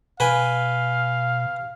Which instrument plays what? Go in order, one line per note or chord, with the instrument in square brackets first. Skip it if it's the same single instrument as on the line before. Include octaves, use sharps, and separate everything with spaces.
[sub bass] B2 [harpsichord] B4 G5 G#5 [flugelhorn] F5